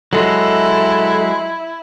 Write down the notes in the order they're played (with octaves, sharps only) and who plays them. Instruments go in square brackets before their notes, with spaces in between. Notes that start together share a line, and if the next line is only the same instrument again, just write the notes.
[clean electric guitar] F#3 G#3 [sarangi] E4 [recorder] A4